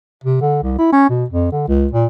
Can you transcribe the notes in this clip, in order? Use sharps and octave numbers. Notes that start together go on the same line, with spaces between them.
C3
D3
C2
E4
C#4
B2
F2
D3
C#2
A#2